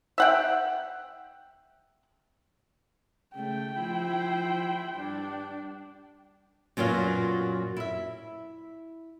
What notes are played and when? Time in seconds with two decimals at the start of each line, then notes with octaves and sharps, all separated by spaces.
0.18 E5 F#5 G5
3.36 C#3 A3 G5
3.79 F3 E4 C5
4.96 G2 D4
6.77 F#2 A#2 F#3 B3 F4
7.77 E4 E5